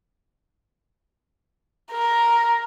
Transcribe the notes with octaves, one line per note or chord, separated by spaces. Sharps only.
A#4